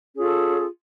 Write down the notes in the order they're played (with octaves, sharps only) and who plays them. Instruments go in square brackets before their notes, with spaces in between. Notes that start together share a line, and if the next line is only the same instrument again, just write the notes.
[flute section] C#4
G#4
F4
A4